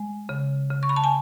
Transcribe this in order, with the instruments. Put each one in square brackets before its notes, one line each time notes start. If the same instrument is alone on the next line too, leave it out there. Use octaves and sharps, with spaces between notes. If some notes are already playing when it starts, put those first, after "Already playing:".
Already playing: [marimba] G#3
C#3
C#3
C#6
B5
A5
G#5